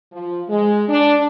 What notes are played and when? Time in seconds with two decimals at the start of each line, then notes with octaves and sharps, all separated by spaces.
0.12 F3
0.49 G#3
0.88 D4